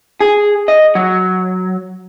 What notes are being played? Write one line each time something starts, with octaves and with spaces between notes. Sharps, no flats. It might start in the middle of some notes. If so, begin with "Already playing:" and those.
G#4
D#5
F#3